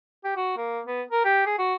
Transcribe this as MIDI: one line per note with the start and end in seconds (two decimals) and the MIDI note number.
0.24 0.34 67
0.36 0.55 66
0.57 0.81 58
0.86 1.02 59
1.11 1.25 70
1.25 1.44 67
1.46 1.54 68
1.59 1.75 66